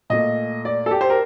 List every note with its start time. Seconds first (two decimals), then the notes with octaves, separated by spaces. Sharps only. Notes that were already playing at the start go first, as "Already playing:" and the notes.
0.10 A#2 A3 D#5
0.65 D5
0.86 A4
0.91 G4
1.01 C5
1.10 A#4